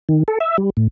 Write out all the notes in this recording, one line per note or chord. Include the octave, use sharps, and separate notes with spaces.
D#3
A4
E5
G3
A2